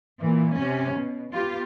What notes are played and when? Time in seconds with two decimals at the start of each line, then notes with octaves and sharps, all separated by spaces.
0.19 A#2 E3
0.56 C3 C#4
0.96 B2
1.34 B3 F4 G4